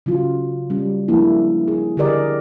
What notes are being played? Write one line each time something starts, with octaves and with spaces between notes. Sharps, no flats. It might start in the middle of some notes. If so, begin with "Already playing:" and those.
C#3 F#3 F4
G3 C#4
F3 G#3 A#3 D4 E4
G#4
D3 G4 G#4 A#4 D5 D#5